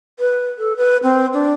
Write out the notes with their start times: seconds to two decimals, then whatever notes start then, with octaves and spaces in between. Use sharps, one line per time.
0.19 B4
0.58 A4
0.77 B4
1.03 C4
1.34 D4